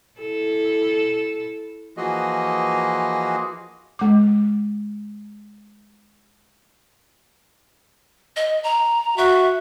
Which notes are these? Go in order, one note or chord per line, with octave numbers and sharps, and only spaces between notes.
E4 A4
E3 F3 A#3 F#4 G#4 D#5
G#3 D6
D#5
A#5
F#4 E5